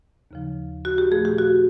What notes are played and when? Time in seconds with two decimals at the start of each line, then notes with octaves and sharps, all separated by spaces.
0.31 D#2 C#3 F3
0.85 F#4
0.98 G4
1.11 A#2 F3 A3 G#4
1.25 G4
1.38 F#4